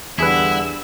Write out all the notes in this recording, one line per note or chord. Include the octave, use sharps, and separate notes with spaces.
E2 D3 G3 E4 G#4 B4 E6